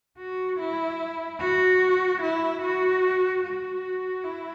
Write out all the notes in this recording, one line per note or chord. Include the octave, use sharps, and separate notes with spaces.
F#4
E4
F#4
E4
F#4
F#4
E4